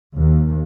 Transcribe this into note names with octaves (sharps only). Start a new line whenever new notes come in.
D#2